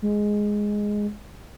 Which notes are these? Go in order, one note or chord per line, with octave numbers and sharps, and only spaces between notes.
G#3